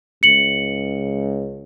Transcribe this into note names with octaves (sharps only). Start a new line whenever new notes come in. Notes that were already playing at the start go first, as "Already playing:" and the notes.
C#2 C#7 F#7